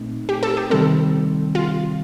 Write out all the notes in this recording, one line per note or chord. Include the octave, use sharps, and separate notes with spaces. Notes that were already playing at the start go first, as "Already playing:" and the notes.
Already playing: A#2 A3 C4 D#4
G4
A4
G4
C3 D#3 G3 C4 A4
F4